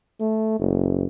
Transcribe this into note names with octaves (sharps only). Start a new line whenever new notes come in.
A3
F#1